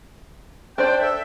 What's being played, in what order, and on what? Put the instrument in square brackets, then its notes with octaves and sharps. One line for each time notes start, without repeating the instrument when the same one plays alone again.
[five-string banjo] D4 C5 D5 [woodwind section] G5
[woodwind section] A4 E5